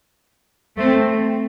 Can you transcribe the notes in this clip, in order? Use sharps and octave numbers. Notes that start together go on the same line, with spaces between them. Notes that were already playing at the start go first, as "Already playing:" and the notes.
A3 C4